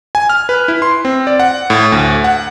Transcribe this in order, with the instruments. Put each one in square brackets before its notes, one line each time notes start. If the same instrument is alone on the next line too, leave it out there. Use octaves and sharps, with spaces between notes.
[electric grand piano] G#5
F6
B4
E4
C6
C4
D5
F#5
A2
D2
F#5